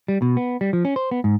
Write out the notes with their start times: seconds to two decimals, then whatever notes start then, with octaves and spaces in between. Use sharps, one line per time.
0.08 G3
0.22 B2
0.37 B3
0.61 G3
0.73 F3
0.85 C#4
0.96 C5
1.11 B3
1.24 G#2